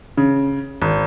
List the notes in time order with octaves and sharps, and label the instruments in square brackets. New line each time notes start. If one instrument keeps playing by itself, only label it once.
[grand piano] C#3
G#1